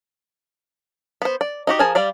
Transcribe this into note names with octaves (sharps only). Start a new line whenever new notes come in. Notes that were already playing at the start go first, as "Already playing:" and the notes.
B3 C5
D5
D#4 F#4 G4
F3 G#4 A#4 G#5 A5
G3 D5 F5